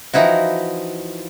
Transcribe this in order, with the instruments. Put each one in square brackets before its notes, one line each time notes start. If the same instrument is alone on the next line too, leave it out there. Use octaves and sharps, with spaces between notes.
[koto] E3 F3 D#4 E4 F#4